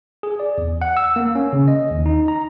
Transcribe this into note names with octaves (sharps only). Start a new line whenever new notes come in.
G#4
D5
E2
F#5
E6
A#3
C#4
C#3
D#5
D#2
D#4
A#5